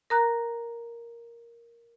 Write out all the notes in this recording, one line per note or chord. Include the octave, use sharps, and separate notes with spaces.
A#4 A#5 F#6